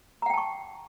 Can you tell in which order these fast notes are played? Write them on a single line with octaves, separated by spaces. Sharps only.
A#5 F#5 G5 A5 C#6